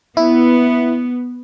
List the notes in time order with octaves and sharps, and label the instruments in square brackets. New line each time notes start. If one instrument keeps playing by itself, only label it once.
[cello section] B3 [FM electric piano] E4